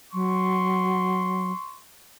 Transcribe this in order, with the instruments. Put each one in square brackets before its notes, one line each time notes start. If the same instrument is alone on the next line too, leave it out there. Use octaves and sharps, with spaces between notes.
[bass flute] F#3 [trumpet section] C6 C#6